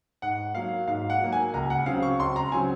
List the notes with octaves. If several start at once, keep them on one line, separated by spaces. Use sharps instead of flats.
G#2 F#5
F#3 A#3 F5
G#2 F5
F#5
F#3 A#3
G#5
C#2 A#5
F#5
C#3 F#3 C4 F5
C#6
C#2 C6
A#5
C#3 F#3 C4 G#5